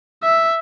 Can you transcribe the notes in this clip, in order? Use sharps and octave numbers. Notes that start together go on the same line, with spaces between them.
E5